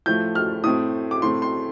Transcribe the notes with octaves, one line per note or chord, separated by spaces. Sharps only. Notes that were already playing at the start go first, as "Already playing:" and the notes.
A2 F3 A3 G6
F6
A2 A3 C4 D#6
D6
A2 A3 C4 C6
C6